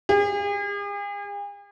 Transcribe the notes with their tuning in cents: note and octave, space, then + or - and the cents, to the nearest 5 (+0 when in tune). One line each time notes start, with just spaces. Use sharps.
G#4 -45